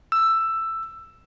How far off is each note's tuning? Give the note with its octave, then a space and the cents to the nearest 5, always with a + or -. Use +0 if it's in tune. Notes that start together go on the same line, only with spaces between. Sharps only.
E6 +10